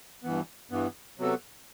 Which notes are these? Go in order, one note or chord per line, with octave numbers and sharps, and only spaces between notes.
G2 E3 B3
G2 E3 B3
C3 F#3 B3 F#4 A4